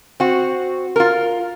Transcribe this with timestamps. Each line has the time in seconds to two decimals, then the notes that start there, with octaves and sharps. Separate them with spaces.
0.20 C4 F#4
0.96 F4 A#4